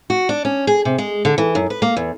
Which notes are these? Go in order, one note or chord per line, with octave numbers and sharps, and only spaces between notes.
F#4
D4
C#4
G#4
C3
G#3
D3
E3
F#2
B4
A#3
E2